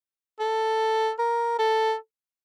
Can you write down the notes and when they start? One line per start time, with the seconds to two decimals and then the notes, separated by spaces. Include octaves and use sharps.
0.39 A4
1.19 A#4
1.59 A4